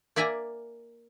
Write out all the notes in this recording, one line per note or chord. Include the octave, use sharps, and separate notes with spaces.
A#3 D5 E5 G#5 A#5